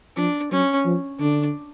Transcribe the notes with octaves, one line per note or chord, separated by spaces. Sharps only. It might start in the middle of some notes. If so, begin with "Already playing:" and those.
F3 D4
F#3 C#4
F3
D3 D4